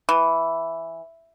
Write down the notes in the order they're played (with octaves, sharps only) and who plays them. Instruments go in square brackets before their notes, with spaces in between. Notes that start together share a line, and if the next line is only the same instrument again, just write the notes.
[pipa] E3